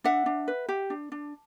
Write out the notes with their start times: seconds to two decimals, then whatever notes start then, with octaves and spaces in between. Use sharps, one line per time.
0.04 D4 E5 F#5
0.26 D4
0.48 B4
0.69 G4
0.90 D4
1.12 D4